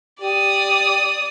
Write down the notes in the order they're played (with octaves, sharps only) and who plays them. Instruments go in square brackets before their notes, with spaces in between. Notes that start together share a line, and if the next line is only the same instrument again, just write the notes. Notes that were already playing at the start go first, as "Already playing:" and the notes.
[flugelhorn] G4 [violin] D5 D#6